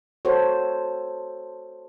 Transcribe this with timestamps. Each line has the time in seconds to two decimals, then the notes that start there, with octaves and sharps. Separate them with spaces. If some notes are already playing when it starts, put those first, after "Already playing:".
0.25 F#4 A4 C5 C#5